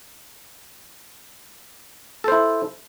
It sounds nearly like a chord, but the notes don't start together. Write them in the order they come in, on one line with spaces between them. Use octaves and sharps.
A4 C5 E4